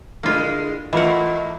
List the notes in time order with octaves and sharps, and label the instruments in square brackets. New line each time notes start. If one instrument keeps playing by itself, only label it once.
[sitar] D3 G#3 [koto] A#3 F4 [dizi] E4
[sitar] G#2 A3 A#3 [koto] E3 F#5 [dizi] F4 [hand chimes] D#5 B5